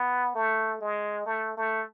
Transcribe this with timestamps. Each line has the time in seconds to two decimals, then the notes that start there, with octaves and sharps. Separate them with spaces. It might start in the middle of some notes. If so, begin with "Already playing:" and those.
Already playing: B3
0.35 A3
0.81 G#3
1.26 A3
1.57 A3